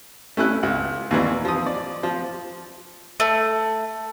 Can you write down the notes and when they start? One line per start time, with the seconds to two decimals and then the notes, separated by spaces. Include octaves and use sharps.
0.37 A3 C#4 E4 F#6
0.63 C#2
1.11 D#2 A#2 E3
1.45 F3 D#6
1.66 D5
2.03 F3
3.20 A3